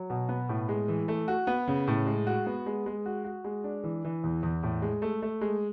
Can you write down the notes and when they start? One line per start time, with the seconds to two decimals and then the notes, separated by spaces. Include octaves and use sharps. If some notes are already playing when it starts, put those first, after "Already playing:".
Already playing: F#3
0.10 B2
0.29 B3
0.49 A2
0.69 G#3
0.88 E3
1.08 A3
1.28 F#4
1.47 B3
1.68 C#3
1.87 A2
2.06 G#3
2.27 F#4
2.46 B3
2.66 G#3
2.86 G#3
3.06 F#4
3.24 F#4
3.44 G#3
3.64 D4
3.84 E3
4.04 E3
4.24 E2
4.43 E2
4.63 A2
4.82 G#3
5.02 A3
5.22 A3
5.41 G#3